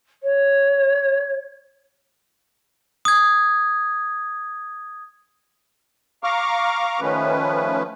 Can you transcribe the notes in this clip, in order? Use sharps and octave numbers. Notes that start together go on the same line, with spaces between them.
C#5
D#6 G#6
F5 A#5 C#6 D6 F6
D#3 F3 A3 C#4 B4